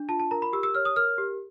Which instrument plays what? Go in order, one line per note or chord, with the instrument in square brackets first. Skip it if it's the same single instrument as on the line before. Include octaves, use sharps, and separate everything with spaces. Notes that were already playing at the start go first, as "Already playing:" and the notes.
Already playing: [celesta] D4
F4 A5
A5
A#4 A#5
B5
G4 E6
E6
C#5 F6
D#6
A#4 F6
G4